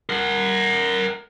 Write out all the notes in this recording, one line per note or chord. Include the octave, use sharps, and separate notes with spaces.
A#4 F#5